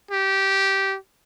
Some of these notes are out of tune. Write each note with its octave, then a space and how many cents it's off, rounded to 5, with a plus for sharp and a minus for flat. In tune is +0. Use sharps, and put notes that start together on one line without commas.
G4 -15